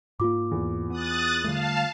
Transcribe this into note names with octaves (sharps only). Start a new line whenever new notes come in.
G#2 A#3 F4 D6
E2
B3 D#6 F#6 A6
D3 G3 A3 F5 A5